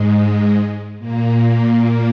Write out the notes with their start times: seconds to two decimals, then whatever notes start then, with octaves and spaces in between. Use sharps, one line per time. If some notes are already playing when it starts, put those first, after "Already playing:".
Already playing: G#2 G#3
0.99 A#2 A#3